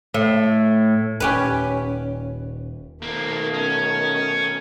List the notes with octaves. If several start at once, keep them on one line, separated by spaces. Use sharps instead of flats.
A2
D#1 C#4 G4 B4
B2 D#3 A3 A#3 C4
C#4